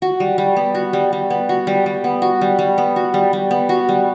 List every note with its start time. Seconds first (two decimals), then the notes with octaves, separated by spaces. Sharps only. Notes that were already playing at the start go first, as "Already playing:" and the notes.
0.02 F#4
0.20 G3
0.38 G3
0.56 B3
0.75 F#4
0.93 G3
1.13 G3
1.30 B3
1.49 F#4
1.67 G3
1.86 G3
2.04 B3
2.22 F#4
2.41 G3
2.59 G3
2.78 B3
2.96 F#4
3.14 G3
3.33 G3
3.51 B3
3.69 F#4
3.89 G3